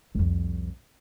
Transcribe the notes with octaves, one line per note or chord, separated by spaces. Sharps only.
C2 F2